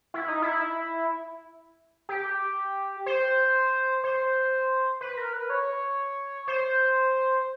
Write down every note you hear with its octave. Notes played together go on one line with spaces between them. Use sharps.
E4
D#4
E4
G4
C5
C5
B4
A#4
B4
C#5
C5